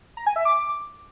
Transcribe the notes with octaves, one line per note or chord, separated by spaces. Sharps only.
A#5
G#5
E5
D6